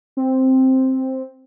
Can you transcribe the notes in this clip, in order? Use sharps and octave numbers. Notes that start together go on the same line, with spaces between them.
C4